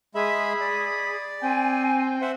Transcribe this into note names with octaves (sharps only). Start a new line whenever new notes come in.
G#3 G#4 E5 B5
D5
C4 G5 G#5
C5 E5 F#5